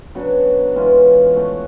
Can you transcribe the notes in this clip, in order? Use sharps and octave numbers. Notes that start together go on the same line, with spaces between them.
C#3 F#3 B3 D4
E3 G#3 C#4 F4
A3 C#4 F#4